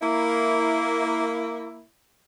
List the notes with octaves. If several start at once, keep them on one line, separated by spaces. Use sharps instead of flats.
A#3 E4